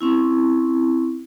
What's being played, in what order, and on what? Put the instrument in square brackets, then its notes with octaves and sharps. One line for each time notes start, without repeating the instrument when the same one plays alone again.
[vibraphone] C4 C#4 E4